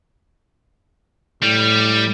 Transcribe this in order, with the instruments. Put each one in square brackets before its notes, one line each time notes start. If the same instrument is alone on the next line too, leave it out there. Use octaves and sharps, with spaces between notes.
[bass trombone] A2 [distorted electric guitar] G3